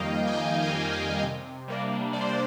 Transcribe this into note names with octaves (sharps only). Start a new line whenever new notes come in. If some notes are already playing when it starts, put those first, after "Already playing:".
Already playing: F2 D#3 G3 A#3 D#5 F5 G5
G#5
F2 G5
G#5
D#3 G3 A#3
G5
C3
G3 A#3 D4
C3 D5
C5
D5